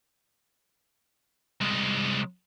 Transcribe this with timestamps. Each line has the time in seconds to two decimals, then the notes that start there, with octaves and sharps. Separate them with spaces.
1.61 C2 G#3